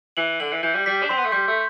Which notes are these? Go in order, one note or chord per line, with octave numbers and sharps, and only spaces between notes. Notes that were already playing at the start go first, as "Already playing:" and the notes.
E3 F#7
D3 F#7
E3
E3 G6
G3
G3 B6
D4
C4 C6
B3
A3
G3 G6
A3